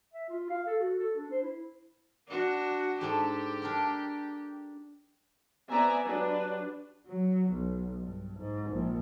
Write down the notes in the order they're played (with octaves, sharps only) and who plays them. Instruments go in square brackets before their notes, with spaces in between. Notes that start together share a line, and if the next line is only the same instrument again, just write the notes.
[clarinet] E5
F4
F5
A4
F#4
A4
D4
C5
E4
[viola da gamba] D4 F#4
[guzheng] G#2 D4 A4 [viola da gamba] G4
[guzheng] D4 A#4 G5
[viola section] B3 C4 D5 E5 G#5 A#5
F#3 D4 G4 B4
[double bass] F#3
B1
G2
G#2
A#1